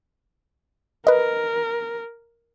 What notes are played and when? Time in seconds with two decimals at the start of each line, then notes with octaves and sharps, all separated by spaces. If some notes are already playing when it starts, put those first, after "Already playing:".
1.07 A#4 B4 D#5